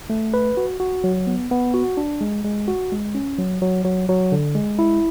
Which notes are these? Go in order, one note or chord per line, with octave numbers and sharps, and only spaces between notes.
A3
B4
F#4
F#4
F#3
B3
B3
F#4
D4
G#3
G#3
F#4
G#3
C#4
F#3
F#3
F#3
F#3
D3
G#3
E4